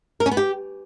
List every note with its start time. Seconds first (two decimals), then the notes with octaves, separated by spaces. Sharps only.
0.20 A#4
0.26 C#4
0.31 B3
0.37 G4